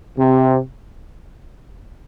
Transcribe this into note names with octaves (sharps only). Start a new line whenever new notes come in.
C3